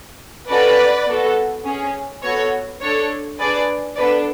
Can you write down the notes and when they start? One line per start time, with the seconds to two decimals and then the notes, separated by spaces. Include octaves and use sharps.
0.49 C#4 F#4 A4 B4 D5
1.07 B3 F#4 A4
1.65 C#4 G#4
2.23 B3 F#4 A4 C#5
2.81 D4 A4 C#5
3.39 D4 G#4 B4 D5
3.97 B3 D4 A4 B4 D5